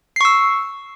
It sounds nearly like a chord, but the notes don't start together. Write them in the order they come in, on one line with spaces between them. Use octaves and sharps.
C7 C#6 E6